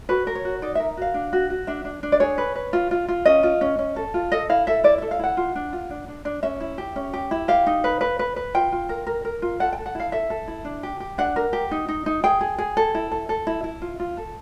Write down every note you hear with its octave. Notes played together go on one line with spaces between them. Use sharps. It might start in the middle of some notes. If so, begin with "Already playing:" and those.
F#4 B4
A#4
C#5
F#4
D#4 D5
A#4 E5
F#4 F5
D4
F#4
F#4
D4 E5
D4
D4
D5
G#4 C#5
B4
B4
F4
F4
F4
C#4 D#5
F4
C#4
C#4
A4
F4
A4 D#5
E4 F5
A4 E5
E4 D5
A4 E5
F5
E4 F#5
F4
D4
F4
D4
D4
D4
C#4 E5
E4
G4
C#4
G4
E4
G4 F5
D#4
B4
B4
B4
B4
F4 G5
F4
A#4
A#4
A#4
F4
A4 F#5
G5
A4
F#5
E4 F5
A4 E5
A4
E4
D4
G4
G4
D4 F#5
A#4
G4
D#4
D#4
D#4
G#4 G5
G#4
G#4
A4
E4
A4
A4
E4
E4
F4
F4
A4